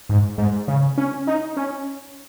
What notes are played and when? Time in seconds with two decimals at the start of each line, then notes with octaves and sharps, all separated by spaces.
0.09 G#2
0.38 G#2
0.68 C#3
0.98 C#4
1.27 D#4
1.57 C#4